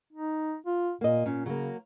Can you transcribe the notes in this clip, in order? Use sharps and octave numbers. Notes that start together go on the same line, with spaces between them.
D#4
F4
A#2 A#3 D#5
A#2 C#4
C#3 F#3 A#3